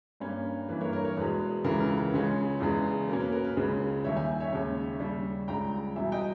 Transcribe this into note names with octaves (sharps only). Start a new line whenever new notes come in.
G2 G3 A#3 C#4
G2 E3 A#3 B4
A#4 C#5
A#4 C#5
A#4 C#5
E2 B2 G#3 B4
C#2 C#3 E3 A#4
A#4
B4
C#2 C#3 G#3 C#4
E2 C#3 G#3 B3
B2 A#3 C#4 A#4
B4
A#4
B4
C#2 C#3 G#3 C#4
D#2 D#3 G3 C#5 E5
E5 G#5
C#5 E5
D#2 C#3 G#3 C#4
D#2 C#3 G3
C#2 C#3 G3 G5 A#5
E2 B2 G3 E5 G#5
D#5 G5